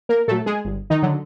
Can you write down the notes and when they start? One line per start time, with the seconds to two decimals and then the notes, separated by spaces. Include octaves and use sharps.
0.09 A#3 A#4
0.28 A#2 F#3 A3 A4
0.46 G#3 G#4
0.65 G1
0.90 D#3 D#4
1.02 D3 F#3